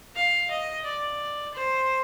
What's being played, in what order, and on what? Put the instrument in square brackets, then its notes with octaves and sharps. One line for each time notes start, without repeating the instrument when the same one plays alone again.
[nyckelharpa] F5
D#5
D5
C5